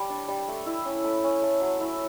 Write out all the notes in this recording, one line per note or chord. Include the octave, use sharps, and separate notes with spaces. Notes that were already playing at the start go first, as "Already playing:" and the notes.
Already playing: G3 A5 B5 D6
D4
G3
A3
E4
C#4
A3 B5
C#4
A3
F#3
E4